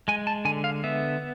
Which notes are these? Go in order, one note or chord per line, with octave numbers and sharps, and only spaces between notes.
G#3 G#5
A5
D3 G#5
F5
B3 E5